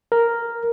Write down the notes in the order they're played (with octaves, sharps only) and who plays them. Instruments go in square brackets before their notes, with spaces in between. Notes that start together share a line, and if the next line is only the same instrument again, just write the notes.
[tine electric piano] A#4